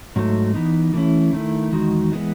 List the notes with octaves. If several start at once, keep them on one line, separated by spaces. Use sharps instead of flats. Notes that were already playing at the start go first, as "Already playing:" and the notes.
G#2 F#3 A3
E3 B3 D#4
E3 A3 C#4 E4
D#3 A3 E4
E2 D#3 G#3 D#4 F#4
E3 G#3 B3